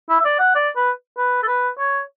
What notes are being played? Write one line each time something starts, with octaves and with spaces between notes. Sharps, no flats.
E4
E5
D5
F#5
D5
B4
B4
A4
B4
C#5